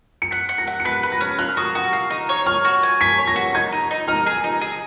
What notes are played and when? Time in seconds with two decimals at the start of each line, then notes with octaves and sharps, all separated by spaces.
0.22 C#7
0.31 F#5 B6
0.49 F#5
0.58 A#6
0.67 F#5
0.80 C#7
0.85 B4 B6
1.03 B4
1.12 A#6
1.21 C#4
1.38 F5 F#6
1.57 F#4 D#6
1.75 F#4 C#6
1.93 F5
2.10 D#4
2.29 C#5
2.46 C#5 F6
2.65 F#4
2.83 G#5
3.01 C#5 B6
3.18 C#5
3.27 A#6
3.36 F#4
3.55 D#4 G#6
3.72 D#4
3.91 D#4
4.08 D#4 F6
4.26 G#4
4.44 D#4
4.61 G#4